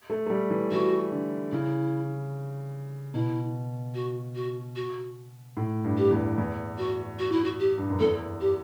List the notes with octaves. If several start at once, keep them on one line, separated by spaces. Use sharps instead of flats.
A3
A3
G3
E3
E3 F#4
D3
C#3 E4
B2 E4
F#4
F#4
F#4
A2
G2
G4
E2
E2
F#4
F#4
E4
F#4
G4
G2
F#2
E2 A4
G4